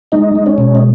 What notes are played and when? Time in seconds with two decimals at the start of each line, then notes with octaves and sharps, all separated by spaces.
0.12 G#3 D#4 D#5
0.35 G#3
0.46 C#4 C#5
0.58 B2
0.75 D#5